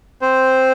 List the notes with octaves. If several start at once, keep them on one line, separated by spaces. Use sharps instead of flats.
C4 C5